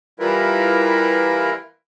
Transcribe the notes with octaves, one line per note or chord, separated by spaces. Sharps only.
E3 G3 E4 F4 A#4 B4